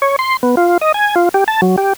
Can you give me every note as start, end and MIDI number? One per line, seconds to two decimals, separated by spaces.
0.02 0.16 73
0.19 0.37 84
0.43 0.55 59
0.57 0.78 65
0.81 0.92 75
0.94 1.15 80
1.16 1.29 65
1.34 1.44 67
1.48 1.61 81
1.62 1.76 54
1.78 1.93 67